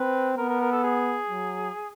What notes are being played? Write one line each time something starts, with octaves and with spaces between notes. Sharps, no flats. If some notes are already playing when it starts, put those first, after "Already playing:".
Already playing: C4 B4
B3 A#4
A#4
A#4
A4
G#4
F#3